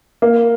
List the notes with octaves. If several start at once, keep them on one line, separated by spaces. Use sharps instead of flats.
A#3